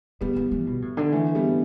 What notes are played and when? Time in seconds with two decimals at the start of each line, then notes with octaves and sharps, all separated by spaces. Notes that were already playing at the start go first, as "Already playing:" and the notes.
0.21 D3 G3 B3
0.36 E3
0.51 E3
0.67 B2
0.82 A2
0.97 D3
1.12 E3 A3
1.35 G3 B3